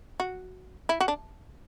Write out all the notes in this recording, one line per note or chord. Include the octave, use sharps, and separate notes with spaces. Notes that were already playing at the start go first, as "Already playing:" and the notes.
F#4
E4
F#4
D4